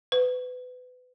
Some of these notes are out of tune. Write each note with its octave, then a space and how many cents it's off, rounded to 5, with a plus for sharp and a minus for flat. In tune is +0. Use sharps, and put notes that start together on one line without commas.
B4 +25